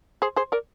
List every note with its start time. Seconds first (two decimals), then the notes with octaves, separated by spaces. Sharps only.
0.22 G#4 C5
0.36 G#4 C5
0.52 A#4 D5